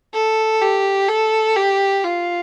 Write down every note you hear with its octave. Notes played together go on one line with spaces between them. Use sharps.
A4
G4
A4
G4
F4